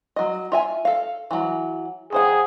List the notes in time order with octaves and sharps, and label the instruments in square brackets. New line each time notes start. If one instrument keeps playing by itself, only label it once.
[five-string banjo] F#3 D#5
F4 E5 G#5
A4 F5
E3 F#3
[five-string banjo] D#3 C5 F#5 [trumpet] G#4